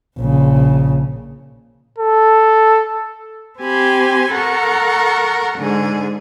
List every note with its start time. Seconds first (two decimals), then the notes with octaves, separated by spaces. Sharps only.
0.18 A#1 C#3
1.99 A4
3.61 C4 G4 G#5 B5 C6
4.35 A4 A#4 F#5 C#6
5.58 G#2 D3 G#4